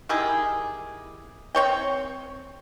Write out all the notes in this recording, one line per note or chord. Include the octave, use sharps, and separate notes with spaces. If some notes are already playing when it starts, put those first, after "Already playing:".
D#3 E4 G4 G#4
C4 C#5 G5